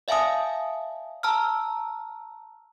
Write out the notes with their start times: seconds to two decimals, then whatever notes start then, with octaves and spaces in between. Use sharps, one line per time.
0.08 D5 E5 F5 G#5 A5 D#6
1.23 A5 A#5 E6 F6